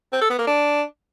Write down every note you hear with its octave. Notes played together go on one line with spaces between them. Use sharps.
C4
A4
B3
A#3
D4